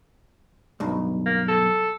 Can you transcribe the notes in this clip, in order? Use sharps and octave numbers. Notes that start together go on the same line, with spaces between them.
B1 G2
A#3
A4